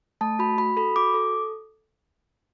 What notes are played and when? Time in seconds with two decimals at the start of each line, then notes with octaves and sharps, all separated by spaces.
0.21 A3 A5
0.39 F#4 B5
0.58 F#4 B5
0.77 A4 B5
0.96 F#4 D6
1.14 A4